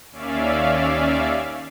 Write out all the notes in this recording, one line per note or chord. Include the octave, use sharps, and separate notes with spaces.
D#2 C#4 D5 E5 F5